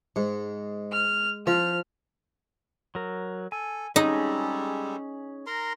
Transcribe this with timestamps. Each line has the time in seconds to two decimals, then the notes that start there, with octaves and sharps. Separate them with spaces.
0.16 G#2 G#3
0.92 F6
1.47 F3 C4 F6
2.95 F#3 A#4
3.52 A4 G#5
3.96 G3 G#3 C#4 D#4 G#4 A4
5.47 A#4 A#5 C6